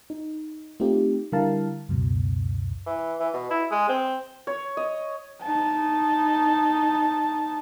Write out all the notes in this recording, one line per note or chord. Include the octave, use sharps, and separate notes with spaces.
D#4
A3 C4 D#4 F4 G4
D3 G3 E4 A#4 F5 A5
C#2 F#2 B2
E3
E3
B2
E4
G#3
C4
C#5
D#5
D#4 A5